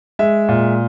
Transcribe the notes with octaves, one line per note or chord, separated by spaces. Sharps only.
G#3 E5
A#2